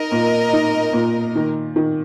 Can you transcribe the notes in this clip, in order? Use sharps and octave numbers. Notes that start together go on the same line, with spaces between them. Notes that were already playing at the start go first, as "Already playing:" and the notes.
Already playing: D#4 A#4 D#5
A#2
D#4
A#2
D#3
D#3